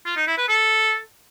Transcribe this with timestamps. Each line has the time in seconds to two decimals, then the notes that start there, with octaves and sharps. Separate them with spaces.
0.06 F4
0.17 D#4
0.27 E4
0.38 B4
0.48 A4